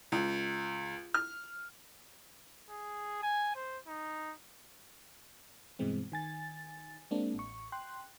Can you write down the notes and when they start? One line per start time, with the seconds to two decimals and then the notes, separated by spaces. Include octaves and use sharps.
0.12 C#2
1.14 F6
2.70 G#4
3.23 G#5
3.56 C5
3.87 D#4
5.79 G2 B2 E3 G#3 C4
6.12 D#3 G#5 A6
7.11 G#3 A#3 C4 D4
7.35 A1 C#6
7.72 G5 C6 F#6